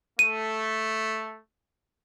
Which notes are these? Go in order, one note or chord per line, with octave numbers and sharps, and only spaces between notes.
A3 D#7